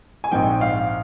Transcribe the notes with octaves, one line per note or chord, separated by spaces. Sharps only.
G#5
A#1 G#2 F3 C4 D#4 G5
F5